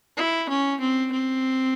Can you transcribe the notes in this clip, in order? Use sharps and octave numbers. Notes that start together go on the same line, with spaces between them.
E4
C#4
C4
C4